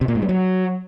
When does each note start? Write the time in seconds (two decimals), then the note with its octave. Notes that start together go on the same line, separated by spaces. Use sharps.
0.01 C3
0.08 A#2
0.15 G#2
0.22 G3
0.29 F#3